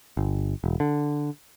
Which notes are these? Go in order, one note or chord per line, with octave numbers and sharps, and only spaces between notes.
G1
E1
D3